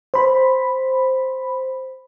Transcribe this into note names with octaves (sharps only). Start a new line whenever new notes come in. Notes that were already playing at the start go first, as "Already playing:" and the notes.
C5 B5